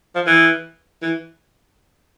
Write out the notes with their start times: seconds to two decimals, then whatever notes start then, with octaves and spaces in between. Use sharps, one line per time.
0.15 F3
0.26 E3
1.02 E3